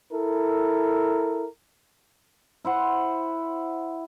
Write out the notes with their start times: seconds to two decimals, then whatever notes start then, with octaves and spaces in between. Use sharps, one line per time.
0.13 E4 A4 A#4
2.64 E4 C5 F#5